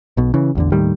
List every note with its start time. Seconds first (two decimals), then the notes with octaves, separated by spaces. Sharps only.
0.17 B1 B2
0.34 C#3 E3
0.55 A1 E2 D3
0.72 D#2 A2 D#3 G3